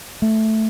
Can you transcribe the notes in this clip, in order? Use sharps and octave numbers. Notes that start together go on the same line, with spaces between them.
A3